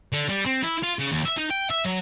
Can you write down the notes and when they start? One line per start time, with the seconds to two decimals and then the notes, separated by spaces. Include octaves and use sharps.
0.12 D3
0.28 G3
0.45 C4
0.63 E4
0.83 F4
0.99 C#3
1.12 D#2
1.25 E5
1.37 D#4
1.51 G5
1.70 E5
1.85 F#3